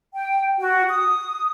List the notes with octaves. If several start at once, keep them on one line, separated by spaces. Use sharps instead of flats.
G5
F#4
D#6